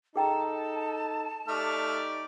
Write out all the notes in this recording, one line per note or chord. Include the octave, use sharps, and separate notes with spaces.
D#4 G#4 A4 G5 A5 A#5
A3 D#4 G4 D5 F6